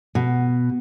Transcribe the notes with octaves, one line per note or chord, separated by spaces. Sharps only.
B2